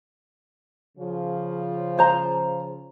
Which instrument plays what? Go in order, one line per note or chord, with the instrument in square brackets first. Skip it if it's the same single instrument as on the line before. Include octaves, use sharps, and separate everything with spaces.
[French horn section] C#3 F3
[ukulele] F4 C5 A#5